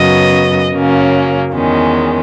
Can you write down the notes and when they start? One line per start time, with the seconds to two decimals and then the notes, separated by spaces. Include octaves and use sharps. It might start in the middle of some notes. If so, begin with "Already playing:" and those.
Already playing: F#2 C#3 F#3 B3 D#5
0.72 F#2 C#3 F#3 A#3 C#4
1.54 E2 D#3 G#3 C#4